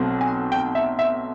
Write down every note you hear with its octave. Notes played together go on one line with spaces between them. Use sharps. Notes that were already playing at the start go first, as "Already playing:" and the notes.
Already playing: B1 B2 F#3 A3 C4
G#5
G5
E5
E5